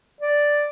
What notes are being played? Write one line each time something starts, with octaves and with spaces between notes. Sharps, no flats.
D5